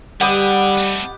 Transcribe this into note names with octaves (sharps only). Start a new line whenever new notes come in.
D3 G3 G4 B4 D#5 F#5
A3 C4